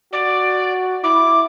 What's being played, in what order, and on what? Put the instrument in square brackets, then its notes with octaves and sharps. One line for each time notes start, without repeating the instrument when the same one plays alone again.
[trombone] F#4 [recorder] D5
[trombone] E4 [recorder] D6